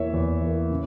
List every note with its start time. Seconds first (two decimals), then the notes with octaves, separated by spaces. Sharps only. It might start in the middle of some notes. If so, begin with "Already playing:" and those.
Already playing: E2 E3 A#3 C#5 E5
0.13 E2
0.41 E3 A#3
0.70 C#3